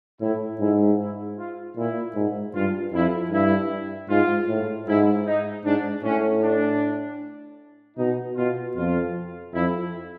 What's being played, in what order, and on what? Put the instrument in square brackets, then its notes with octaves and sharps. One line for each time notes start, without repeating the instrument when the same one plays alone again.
[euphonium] A2 [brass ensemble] E4
[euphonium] G#2 [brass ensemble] E4
[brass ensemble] E4
F4
[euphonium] A#2 [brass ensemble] E4
[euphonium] G#2
[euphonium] G2 [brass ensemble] F4
[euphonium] F2 [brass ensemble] E4
[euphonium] G2 [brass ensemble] E4
[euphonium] G#2 [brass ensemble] F4
[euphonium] A2
[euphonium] G#2 [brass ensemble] E4
[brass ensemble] D#4
[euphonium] G#2 [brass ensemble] D4
[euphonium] A2 [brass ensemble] C#4
[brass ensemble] D4
[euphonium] B2 [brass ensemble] D#4
[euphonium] B2 [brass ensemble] F4
[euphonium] F2 [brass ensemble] F4
[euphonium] F2 [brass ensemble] E4